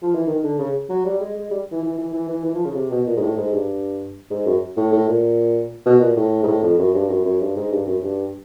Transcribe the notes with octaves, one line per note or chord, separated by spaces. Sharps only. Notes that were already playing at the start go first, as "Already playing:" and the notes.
F3
E3
D#3
D3
C#3
F#3
G3
G#3
G#3
G3
E3
E3
E3
E3
E3
E3
F3
C#3
C3
B2
A#2
G#2
A2
G#2
G2
G#2
F#2
A2
A2
A#2
B2
A#2
A2
G#2
A2
F2
F#2
G2
F#2
F#2
G2
G#2
G2
F#2
G2